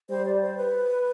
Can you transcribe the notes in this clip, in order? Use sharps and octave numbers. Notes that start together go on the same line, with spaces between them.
G3 C5
D5
C5
B4